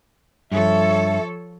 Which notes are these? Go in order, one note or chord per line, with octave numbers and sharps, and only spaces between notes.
G2 F3 A4 C#5 E5